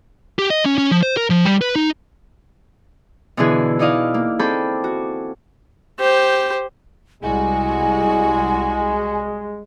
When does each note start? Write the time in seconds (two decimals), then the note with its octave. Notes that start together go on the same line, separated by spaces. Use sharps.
0.39 G4
0.50 D#5
0.65 C#4
0.78 C#4
0.91 F3
1.03 C5
1.17 A#4
1.30 F3
1.45 G3
1.62 B4
1.76 D#4
3.37 B2 D3 E3 B3 E4 G#4
3.79 D#4 E4 D5 D#5 F5
4.14 A#3
4.39 C4 G#4 A4 B5 D6 G6
4.84 F#4
5.99 G4 C5
7.24 C2 G3 G#3 E4 F#4 G#5